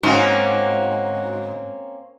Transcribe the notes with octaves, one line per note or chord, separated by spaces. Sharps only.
G#2 A#3 C4 C#4 F#4